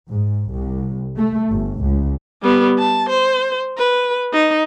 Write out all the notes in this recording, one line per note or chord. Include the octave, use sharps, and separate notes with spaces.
G#2
C2
A3
G1
C#2
G3 B3
A5
C5
B4
D#4